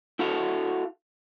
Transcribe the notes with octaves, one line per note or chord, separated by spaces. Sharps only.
E4 F#4 A4 F5